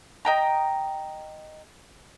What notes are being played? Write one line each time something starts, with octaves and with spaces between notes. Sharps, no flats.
D#5 G5 A#5